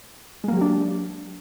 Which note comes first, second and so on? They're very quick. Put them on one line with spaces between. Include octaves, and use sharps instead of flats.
G#3 A#3 F#3 G4 D4